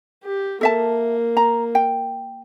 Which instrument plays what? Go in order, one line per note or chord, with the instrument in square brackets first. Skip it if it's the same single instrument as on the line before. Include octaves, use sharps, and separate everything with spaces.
[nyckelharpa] G4
[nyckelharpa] A#3 [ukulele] A4 E5 A5
[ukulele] A#5
G5